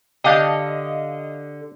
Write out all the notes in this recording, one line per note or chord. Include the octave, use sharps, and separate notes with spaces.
D3 D4 G4 D#5 F5